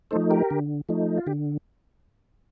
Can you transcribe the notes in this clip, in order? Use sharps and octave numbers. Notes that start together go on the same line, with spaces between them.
F3 A3 D#4 A4 C5
G4 A#4
D3
F3 A3 D#4
F4
D3 G4